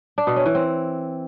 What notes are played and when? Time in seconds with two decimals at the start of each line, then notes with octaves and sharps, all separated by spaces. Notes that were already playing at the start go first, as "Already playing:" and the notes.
0.18 D4
0.27 B2
0.36 C#4
0.46 E3
0.55 C4